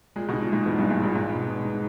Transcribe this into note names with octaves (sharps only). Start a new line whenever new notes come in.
A#2 G#3
B2
D#4
A#2
G#2 G#3
E2 B3
G2
D#4
G#2
D#4
A#2
G#2 G#3
B2
B3
D#4